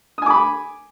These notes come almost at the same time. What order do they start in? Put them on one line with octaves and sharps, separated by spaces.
D#6 G#5 D6 B5